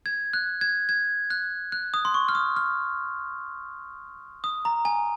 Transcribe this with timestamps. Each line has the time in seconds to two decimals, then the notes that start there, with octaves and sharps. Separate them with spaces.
0.06 G#6
0.33 F#6
0.61 G#6
0.89 G#6
1.30 F#6
1.72 F#6
1.94 D#6
2.05 C6
2.14 C#6
2.29 F6
2.35 D#6
2.56 F6
4.44 D#6
4.65 A#5
4.85 G#5